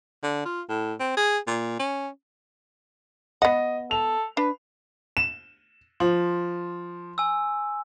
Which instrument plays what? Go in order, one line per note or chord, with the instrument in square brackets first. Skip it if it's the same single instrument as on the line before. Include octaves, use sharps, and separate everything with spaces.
[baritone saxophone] D3
F4
A2
C4
G#4
A#2
C#4
[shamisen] B3 F#5 [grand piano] D#5
[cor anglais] A4 [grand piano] F7
[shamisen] D4 [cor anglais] B4
[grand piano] E7
[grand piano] F3 [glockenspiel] C6
[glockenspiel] G#5 E6